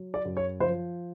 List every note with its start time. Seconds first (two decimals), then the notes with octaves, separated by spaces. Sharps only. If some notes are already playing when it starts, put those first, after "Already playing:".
Already playing: F#3
0.14 D5
0.25 F#2
0.37 C#5
0.60 F3 C5